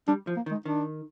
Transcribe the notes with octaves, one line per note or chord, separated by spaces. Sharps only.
G3 D4
F3
A#3
D#3
G#3
D#3 D4